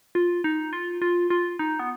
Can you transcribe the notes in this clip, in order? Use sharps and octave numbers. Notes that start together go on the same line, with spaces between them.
F4
D#4
F4
F4
F4
D#4
B3